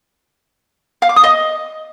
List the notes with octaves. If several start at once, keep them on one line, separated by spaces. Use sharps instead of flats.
F5
D6
D#6
D#5